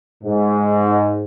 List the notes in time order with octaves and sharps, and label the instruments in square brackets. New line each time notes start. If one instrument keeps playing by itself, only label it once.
[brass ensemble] G#2